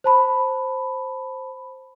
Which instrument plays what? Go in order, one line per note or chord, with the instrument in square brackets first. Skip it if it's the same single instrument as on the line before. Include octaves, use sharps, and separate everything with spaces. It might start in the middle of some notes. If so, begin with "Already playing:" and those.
[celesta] C5 A5 B5